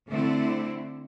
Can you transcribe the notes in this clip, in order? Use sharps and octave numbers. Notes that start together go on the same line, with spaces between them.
D3 A3 C4 E4